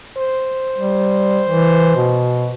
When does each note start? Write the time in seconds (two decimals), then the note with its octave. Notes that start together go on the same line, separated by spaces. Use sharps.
0.17 C5
0.77 G3
1.48 E3
1.96 B2